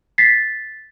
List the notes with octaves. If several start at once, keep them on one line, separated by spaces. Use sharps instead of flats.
A6 B6 C7